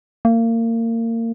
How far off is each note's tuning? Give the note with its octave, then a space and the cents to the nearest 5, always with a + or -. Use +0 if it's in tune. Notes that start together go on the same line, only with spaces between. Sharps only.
A#3 -30